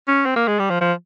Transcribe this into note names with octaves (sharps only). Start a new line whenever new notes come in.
C#4
C4
A#3
G#3
G3
F3
F3